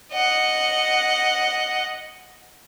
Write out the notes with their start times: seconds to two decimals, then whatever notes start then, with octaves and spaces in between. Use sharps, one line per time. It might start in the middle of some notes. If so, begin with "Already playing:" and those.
0.13 D#5 F#5